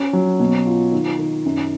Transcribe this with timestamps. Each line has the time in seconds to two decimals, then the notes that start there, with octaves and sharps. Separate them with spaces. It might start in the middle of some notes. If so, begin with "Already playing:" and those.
Already playing: C#4
0.13 F#3
0.40 B2
0.66 F4
0.92 D#3
1.19 D#3
1.45 F#2